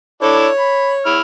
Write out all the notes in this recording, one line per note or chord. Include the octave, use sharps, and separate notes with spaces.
D4 E4 A4 C#5
B5
E4 F6